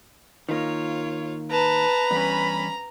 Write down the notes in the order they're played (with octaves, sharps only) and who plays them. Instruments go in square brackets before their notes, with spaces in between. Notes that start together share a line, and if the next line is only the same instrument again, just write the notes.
[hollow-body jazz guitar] D#3 A#3 [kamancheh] F4 C#5
[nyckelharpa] B4 [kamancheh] A5 [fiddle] A#5
[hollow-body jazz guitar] E2 G2 [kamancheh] C#4 B5